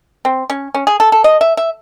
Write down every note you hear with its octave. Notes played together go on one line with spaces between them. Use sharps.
C4
C#4
C#4
G#4
A4
A4
D#5
E5
E5